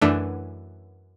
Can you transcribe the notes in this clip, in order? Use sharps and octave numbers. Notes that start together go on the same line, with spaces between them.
F#2 E3 A3 D4